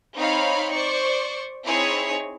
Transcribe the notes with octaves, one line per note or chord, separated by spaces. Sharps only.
C4 D#4 C#5 F5 B5
C5 D5 C#6
C4 D#4 E4 G#4 C#5